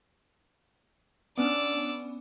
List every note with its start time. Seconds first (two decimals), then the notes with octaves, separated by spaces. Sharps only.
1.38 B3 C#4 D4 D5 E6